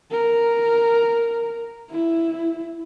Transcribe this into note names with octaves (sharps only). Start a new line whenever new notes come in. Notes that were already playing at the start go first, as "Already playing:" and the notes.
A#4
E4